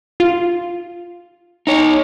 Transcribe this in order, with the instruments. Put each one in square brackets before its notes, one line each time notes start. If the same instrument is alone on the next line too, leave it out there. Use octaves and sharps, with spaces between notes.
[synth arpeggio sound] F4
[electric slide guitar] D#4 C#5